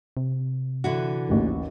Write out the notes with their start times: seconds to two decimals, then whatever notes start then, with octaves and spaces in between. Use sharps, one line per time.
0.17 C3
0.84 D3 E3 F#4
1.29 A1 D#2